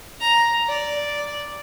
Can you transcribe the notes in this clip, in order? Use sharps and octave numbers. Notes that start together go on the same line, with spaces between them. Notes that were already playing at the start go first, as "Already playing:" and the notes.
A#5
D5